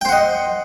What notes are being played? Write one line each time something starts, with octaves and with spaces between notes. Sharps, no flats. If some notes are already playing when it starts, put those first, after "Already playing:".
C5 D#5 F#5 G5